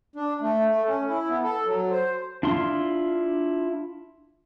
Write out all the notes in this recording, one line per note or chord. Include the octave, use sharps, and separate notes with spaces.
D4
A3
A3
C#4
E4
B3
A4
F#3
C5
D4 E4 F4 C6